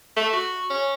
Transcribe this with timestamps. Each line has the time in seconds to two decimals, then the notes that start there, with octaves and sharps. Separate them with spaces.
0.16 A3
0.33 F#4
0.70 C#4